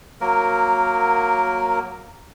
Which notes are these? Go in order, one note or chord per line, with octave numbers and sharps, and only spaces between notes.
F#3 A#3 A#4